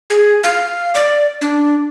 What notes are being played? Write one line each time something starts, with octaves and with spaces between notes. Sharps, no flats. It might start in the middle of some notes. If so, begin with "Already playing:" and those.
G#4
F5
D5
D4